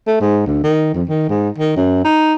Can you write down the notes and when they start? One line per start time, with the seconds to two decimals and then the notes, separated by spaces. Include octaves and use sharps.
0.07 A3
0.21 G#2
0.47 D2
0.63 D#3
0.94 F2
1.09 D#3
1.29 G#2
1.58 D#3
1.76 F#2
2.04 D#4